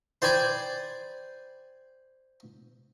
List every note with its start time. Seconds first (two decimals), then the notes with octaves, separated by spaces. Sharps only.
0.22 C5 D5 G5 G#5 B5 D6